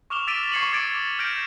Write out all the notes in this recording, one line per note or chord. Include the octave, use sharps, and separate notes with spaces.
C#6 D6 F6 E7 F7 G7
D6 E6 A6 B6 D7 D#7
C#6 G#6 C7 C#7 D#7 F#7
D6 G#6 A6 D7
A6
F6 G6 G#6 A#6 D7 E7